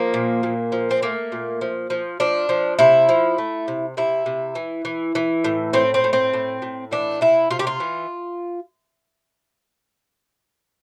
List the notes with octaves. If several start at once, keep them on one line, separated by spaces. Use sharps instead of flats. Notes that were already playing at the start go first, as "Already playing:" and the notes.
Already playing: F3 A#3
A#2
A#2
F3
C4
A3 A#3
A#2
F3
F3
F3 D4
F3
C3 E4
F3
A3
C3
C3 E4
C3
E3
E3
E3
A2
A2 C4
C4
A2
C4
A2
A2
E3 D4
C3 E4
C3 F4
G4
F4
E3